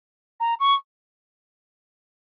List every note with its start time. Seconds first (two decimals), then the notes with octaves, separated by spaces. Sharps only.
0.40 A#5
0.60 C#6